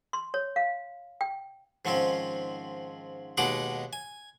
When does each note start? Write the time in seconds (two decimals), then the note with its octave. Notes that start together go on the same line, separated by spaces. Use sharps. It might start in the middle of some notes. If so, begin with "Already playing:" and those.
0.13 C6
0.34 C#5
0.56 F5
1.21 G5
1.85 G#2 D#3 F3 C4 C#4
3.37 D#2 B2 G#3 D#4 F#5 D6
3.93 G#5